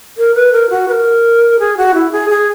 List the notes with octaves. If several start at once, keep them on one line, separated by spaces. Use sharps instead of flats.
A#4
B4
A#4
F#4
B4
A#4
G#4
F#4
E4
G#4
G#4